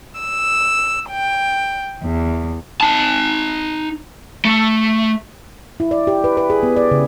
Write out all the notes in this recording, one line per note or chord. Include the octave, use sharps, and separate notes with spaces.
E6
G5
E2
D#4 A5
A3
E4
D5
G4
B4
B4
G#4
B3
D5
C#3